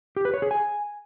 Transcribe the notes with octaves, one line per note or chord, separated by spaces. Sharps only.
G4
B4
C#5
G#4
G#5